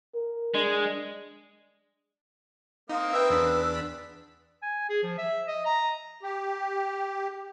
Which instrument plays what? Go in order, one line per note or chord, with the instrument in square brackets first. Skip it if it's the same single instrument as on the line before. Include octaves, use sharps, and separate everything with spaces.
[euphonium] A#4
[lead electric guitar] G#3 [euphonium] D4
[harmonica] A#3 C4 D#6 [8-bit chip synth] D#4 [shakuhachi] F5
[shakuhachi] B4 [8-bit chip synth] E5 G5 [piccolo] E6
[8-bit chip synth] E2 D4 B6
[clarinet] G#5
G#4
F3
E5
D#5
A#5
[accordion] G4